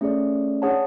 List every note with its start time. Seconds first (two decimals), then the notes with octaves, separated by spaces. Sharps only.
0.01 A3 C#4 G#4 D5
0.62 D4 G#4 C#5 F#5 A5